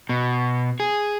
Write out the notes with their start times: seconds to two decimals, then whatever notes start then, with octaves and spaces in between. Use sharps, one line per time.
0.09 B2
0.80 G#4